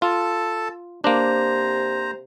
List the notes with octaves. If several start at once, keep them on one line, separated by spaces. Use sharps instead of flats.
F4 A4 A5
C3 A#3 D4 C5 A#5